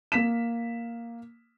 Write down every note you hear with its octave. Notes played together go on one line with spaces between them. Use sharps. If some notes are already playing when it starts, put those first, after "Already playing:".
A#3 B6 E7